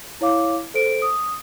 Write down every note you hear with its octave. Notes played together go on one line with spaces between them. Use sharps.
E4 C#5 F5 D6
A4 C5 D7
D#6